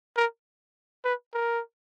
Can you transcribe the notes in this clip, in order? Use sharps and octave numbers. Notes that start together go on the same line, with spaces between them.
A#4
B4
A#4